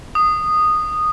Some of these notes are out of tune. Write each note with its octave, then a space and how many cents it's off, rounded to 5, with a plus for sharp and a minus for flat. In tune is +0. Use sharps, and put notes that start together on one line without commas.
D#6 -10